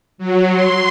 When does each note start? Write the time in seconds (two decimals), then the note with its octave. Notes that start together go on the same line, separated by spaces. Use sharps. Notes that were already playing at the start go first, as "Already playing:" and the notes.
0.18 F#3
0.51 C6